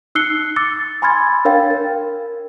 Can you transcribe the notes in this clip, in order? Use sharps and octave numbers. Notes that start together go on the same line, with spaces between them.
D#4 E6 F#6 C7 C#7 G7
D6 E6 A6 C#7
G#5 B5 C6 F6 G#6 A6
D4 A#4 C#5 F5 G5 A6
A#4